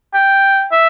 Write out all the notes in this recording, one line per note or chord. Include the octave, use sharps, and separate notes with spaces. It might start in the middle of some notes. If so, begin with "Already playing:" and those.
G5
E5